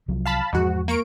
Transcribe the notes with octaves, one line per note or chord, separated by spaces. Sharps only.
C2 F3 F#3
F5 A5 B5
E2 G#2 F3 G#3 F#4
A#3 C#6 D7